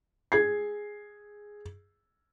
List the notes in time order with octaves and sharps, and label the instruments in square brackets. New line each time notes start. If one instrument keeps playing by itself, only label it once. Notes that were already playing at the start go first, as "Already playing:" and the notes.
[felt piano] G#4 G#6 C7